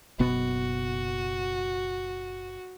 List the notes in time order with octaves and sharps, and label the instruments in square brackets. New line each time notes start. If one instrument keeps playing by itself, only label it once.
[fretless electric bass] F#1 B2 B3 [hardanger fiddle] F#4